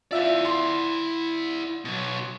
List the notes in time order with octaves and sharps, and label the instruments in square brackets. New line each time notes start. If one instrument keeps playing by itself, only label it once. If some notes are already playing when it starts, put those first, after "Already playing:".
[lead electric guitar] E4 D5 [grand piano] F4 E5
[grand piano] C6
[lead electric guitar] B2 F#3